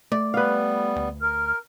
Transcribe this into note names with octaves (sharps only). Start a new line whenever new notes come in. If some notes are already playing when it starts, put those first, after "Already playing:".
A3 D5
G3 B3 B4 F5
D2
A#4 F6